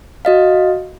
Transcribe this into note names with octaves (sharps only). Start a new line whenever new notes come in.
F#4 D#5 F5